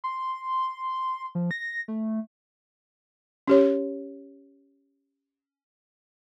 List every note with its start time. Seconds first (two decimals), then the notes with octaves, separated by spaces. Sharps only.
0.04 C6
1.35 F3
1.51 A#6
1.88 A3
3.47 C#4 G4 C#5